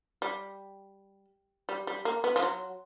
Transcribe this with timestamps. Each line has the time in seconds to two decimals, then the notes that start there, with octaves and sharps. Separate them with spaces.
0.22 G3
1.69 G3
1.87 G3
2.05 A#3
2.24 B3
2.36 F3
2.43 F#3